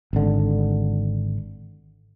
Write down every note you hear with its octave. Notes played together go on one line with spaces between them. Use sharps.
G#1 D3